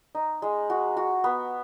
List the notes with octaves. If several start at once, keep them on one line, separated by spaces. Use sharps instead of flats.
D#4
G#3
F#4
F#4
B3